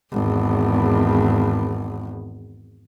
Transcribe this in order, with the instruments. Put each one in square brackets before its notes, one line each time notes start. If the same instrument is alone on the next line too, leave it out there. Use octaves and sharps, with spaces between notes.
[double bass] G#1 E2